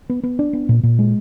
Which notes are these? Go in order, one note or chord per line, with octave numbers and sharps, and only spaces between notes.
B3
B3
D4
B3
A#2
A#2
G#3